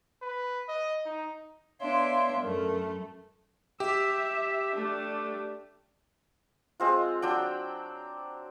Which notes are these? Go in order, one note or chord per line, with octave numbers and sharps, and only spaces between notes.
B4
D#5
D#4
B3 D4 C#5 E5 F5 C6
F#2 A3 A#4
G4 E5
A3 D4
G#3 C4 F4
F#3 D4 G5